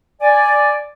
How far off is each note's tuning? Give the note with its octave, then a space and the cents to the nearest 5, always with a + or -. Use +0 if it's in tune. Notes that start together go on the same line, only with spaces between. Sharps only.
D5 +0 G#5 +0